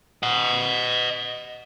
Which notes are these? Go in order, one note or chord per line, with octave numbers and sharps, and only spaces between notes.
D#5 F#5